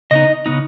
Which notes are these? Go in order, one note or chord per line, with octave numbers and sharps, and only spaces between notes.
C#3 B3 D#4 D#5
C#3 B3 D#4